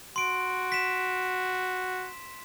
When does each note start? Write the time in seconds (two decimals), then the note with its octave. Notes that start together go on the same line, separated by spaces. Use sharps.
0.16 F#4 C6 D7
0.72 B6 E7